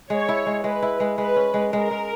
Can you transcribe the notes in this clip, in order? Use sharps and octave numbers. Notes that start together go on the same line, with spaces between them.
G#3 C#5
E4
G#3
G#3 B4
E4
G#3
G#3 B4
C#4
G#3
G#3 A#4
G#3